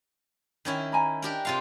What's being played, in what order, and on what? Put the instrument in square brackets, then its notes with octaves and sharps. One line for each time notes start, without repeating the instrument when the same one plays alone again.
[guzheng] D#3 C#4 E4
[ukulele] G#5 A#5 B5
[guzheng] D4 G4 A#4
C3 F4 F5